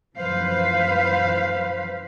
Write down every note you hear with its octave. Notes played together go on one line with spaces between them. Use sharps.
F#2 E3 F3 B4 C5 F5